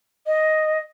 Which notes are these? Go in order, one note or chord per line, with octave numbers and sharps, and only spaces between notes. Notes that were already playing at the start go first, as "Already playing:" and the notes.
D#5